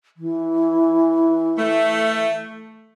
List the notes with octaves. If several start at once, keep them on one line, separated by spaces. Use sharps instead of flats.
E3
A3